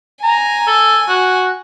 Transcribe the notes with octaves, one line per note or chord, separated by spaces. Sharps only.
G#5 A#5
A4
F#4